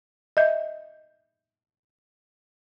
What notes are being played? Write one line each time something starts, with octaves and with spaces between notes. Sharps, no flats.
D#5 E5 G6